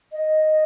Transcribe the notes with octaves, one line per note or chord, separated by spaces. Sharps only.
D#5